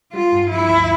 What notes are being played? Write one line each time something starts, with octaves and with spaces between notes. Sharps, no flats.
G3 F4
G2
F3 E4
D2